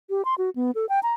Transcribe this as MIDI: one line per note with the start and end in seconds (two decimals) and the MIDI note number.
0.10 0.25 67
0.25 0.35 84
0.38 0.50 66
0.56 0.71 59
0.75 0.86 69
0.89 1.00 79
1.03 1.14 82